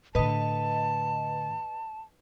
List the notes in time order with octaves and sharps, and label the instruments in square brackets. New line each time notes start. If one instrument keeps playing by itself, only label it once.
[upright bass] A2 D3 [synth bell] B4 D#5 [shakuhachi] A5